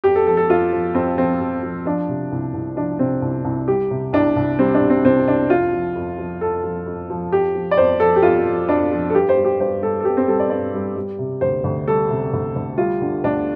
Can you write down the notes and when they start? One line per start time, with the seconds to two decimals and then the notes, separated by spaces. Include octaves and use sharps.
0.04 F2 G4
0.16 A4
0.27 F3 A4
0.37 A4
0.49 F2 F4
0.73 F3
0.94 F2 C4
1.17 F3 C4
1.40 F2
1.63 F3
1.86 F3 D4
2.09 C3
2.32 C2
2.54 C2
2.76 F3 D4
2.99 C3 C4
3.22 C2
3.44 C2
3.68 G3 G4
3.91 C3
4.13 C2 D4
4.36 C2
4.59 G3 C4
4.74 D4
4.81 C3
4.90 C4
5.05 C2 C4
5.28 C2 D4
5.50 F2 F4
5.72 F3
5.96 F2
6.18 F3
6.41 F2 A4
6.64 F3
6.86 F2
7.10 F3
7.32 F2 G4
7.55 F3
7.71 D5
7.77 F2 C5
8.00 F3 A4
8.16 G4
8.22 F2 F4
8.45 F3
8.68 F2 D4
8.92 F3
9.10 A4
9.14 G2 G4
9.29 C5
9.37 G3
9.45 G4
9.60 G2 C5
9.82 G3 A4
10.00 A4
10.05 G2 G4
10.17 C4
10.28 G3 A4
10.39 D5
10.50 G2 D5
10.74 G3
10.96 G3
11.19 C3
11.41 D2 C5
11.64 D2
11.88 G3 A4
12.11 C3
12.33 D2
12.56 D2
12.78 G3 F4
13.02 D3
13.24 D2 D4